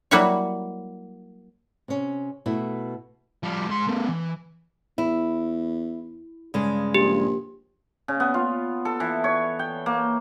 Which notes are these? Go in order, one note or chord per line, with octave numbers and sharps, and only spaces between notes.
F#3 G3 A#3 E4 F#4 C#5
C3 C#4
B2 A3 E4
F3 G3
G#2 C6
A3 B3
E3
E2 E4
G2 C#3 G#3
A#1 G4
C#3
B3
F4
A4
E3
C#5
G5
A#3